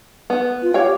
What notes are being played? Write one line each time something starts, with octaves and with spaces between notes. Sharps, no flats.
B3
F4
G4 C#5 F5 G5